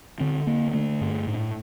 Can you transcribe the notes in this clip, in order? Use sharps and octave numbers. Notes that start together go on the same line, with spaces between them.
D3 C4
D3 A#3
D3 A3
G2
A2